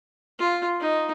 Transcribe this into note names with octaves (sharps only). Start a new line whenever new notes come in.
F4
D#4